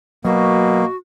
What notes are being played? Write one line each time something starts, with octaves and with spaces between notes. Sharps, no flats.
B2 F#3 A#3 F#4